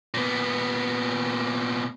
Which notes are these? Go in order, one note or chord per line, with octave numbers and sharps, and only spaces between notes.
A#2 B3